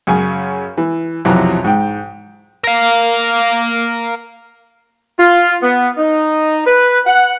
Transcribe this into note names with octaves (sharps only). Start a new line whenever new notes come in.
F#2 C#3 G#5
E3
B1 F2 C3 E3 F#3
G#2 G5
A#4 F5
F4
B3
D#4
B4
F#5